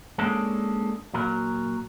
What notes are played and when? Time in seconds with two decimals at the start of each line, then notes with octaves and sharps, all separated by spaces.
0.18 G#3 A#3 C#4 D4 A4
1.14 A#2 F#3 A#4